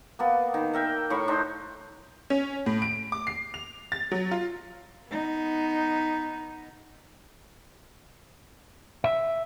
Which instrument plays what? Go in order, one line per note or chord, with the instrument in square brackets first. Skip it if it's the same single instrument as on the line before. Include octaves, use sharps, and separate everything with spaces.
[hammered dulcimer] A#3 B3 A5
D#3
A#4 E5 G5
A2 C#5 B5 C#6
D4 D#4 C5
[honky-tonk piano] C#4
A2
D7
D6
C7
F7
A6
F#3
F4
[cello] B3 D#4
[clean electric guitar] E5